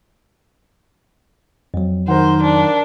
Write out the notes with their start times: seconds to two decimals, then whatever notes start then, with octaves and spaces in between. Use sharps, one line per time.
1.74 F2 F#3
2.08 D#3 A#4 C5 F#5
2.43 D4